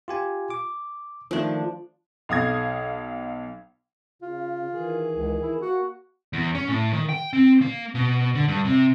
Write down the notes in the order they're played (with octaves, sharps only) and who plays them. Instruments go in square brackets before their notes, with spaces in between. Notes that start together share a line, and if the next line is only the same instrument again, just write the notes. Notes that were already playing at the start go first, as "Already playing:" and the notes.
[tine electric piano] F4 G4 G#5
D6
[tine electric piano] D#3 A3 [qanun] F3 D4
[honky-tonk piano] B1 F5 D#6 G#6
[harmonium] C#3 [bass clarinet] F4
[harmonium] D#3 E3 G#4
[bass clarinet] C#2
E4
[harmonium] A#3 F#5 [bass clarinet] F#4
[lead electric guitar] E2
C#4
A2
D#3
G5
C4
A#3
B2
D3
G2
C3